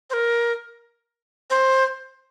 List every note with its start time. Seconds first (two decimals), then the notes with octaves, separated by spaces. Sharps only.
0.10 C5
0.13 A#4
1.50 C5